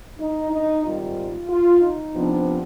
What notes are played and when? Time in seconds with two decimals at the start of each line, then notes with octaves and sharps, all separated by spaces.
0.19 D#4
0.51 D#4
0.84 G#2 D#3 G3 C4 F4
1.49 F4
1.81 D#4
2.14 C3 F3 B3 D4